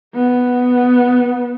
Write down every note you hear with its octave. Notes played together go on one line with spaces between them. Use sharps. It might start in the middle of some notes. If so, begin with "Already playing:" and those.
B3